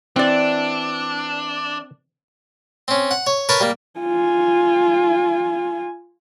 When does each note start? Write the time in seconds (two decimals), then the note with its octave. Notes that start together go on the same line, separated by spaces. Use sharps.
0.16 E3 C4 D4 D5
2.88 C4 C#4
3.11 F#5
3.27 C#5
3.49 A#4 B4 C#5 A5 B5
3.61 G3 A#3
4.00 F4 G#5